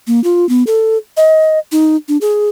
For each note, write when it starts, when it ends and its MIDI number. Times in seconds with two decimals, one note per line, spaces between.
0.07 0.22 58
0.24 0.48 65
0.49 0.63 59
0.67 0.98 69
1.17 1.59 75
1.72 1.96 63
2.08 2.17 62
2.21 2.49 68